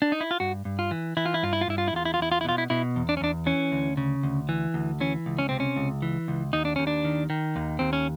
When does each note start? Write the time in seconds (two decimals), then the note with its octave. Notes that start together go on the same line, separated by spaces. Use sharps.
0.02 D4
0.12 D#4
0.21 E4
0.31 F4
0.40 G2 F#4
0.65 G2
0.79 F4
0.91 E3
1.17 E3 E4
1.26 F4
1.34 E4
1.43 G2 F4
1.53 E4
1.61 F4
1.68 G2 E4
1.78 F4
1.88 E4
1.93 E2 F4
2.05 E4
2.14 F4
2.19 E2 E4
2.32 F4
2.41 E4
2.45 B2 F4
2.58 E4
2.70 B2 E4
2.96 E2
3.09 D4
3.17 C#4
3.21 E2 D4
3.46 E3 C#4
3.72 D2
3.97 C#3
4.23 D2
4.49 E3
4.74 D2
5.01 E3 C#4
5.26 C#2
5.39 C#4
5.49 C3 C4
5.60 C#4
5.76 C#2
6.02 E3
6.28 C#2
6.53 D#2 D#4
6.65 D4
6.76 D#2 C#4
6.87 D4
7.05 D#3
7.30 D#3
7.56 D#2
7.79 D#2 C4
7.93 C#4